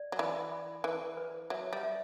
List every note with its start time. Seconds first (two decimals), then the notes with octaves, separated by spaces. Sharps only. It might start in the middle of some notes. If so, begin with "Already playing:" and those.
Already playing: D5
0.12 F#3
0.19 E3 B5
0.52 B5
0.84 E3 B4
1.17 B4
1.50 F#3 E5
1.73 G3
1.83 E5